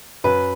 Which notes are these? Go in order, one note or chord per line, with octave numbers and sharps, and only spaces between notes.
F#2 B4